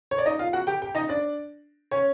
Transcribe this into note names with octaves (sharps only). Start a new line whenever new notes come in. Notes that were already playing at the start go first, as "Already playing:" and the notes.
C#5
D5
D#4 D#5
F4 F5
F#4 F#5
G4 G5
G4 G5
D#4 D#5
D4 D5
C#4 C#5